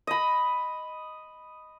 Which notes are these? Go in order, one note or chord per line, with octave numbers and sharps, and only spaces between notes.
D#5 B5